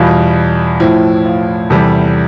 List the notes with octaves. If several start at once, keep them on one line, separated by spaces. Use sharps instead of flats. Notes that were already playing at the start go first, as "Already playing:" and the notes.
Already playing: E2 B2 G3 F4
A2 F3 E4
F4
E2 C3 G3 A4